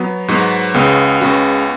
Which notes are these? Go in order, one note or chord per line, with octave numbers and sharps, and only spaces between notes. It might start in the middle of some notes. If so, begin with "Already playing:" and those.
Already playing: F#3 B3
G#2 F#3 B3 F#4
C#2 C#3 B3
C#2 C#3 B3 F#4